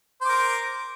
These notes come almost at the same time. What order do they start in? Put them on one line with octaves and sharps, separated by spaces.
C5 D6 A#4